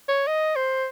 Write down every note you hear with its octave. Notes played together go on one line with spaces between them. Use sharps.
C#5
D#5
C5